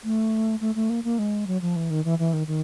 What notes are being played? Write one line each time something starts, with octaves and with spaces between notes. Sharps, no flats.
A3
A3
A3
A#3
A#3
G#3
F#3
F3
E3
D#3
E3
E3
D#3
D#3